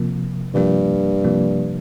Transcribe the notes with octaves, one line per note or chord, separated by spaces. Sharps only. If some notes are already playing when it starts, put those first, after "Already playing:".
Already playing: C3 F3 A#3
G2 C3 F3 A#3
C3 F3 A#3